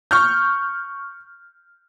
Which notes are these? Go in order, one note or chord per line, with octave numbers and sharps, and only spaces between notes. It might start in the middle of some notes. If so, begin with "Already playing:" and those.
C#6 F6 G6